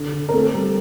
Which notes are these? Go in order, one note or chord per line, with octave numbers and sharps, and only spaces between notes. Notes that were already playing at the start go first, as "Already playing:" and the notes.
Already playing: D3
D3
A#4
A3 C4 A4
G3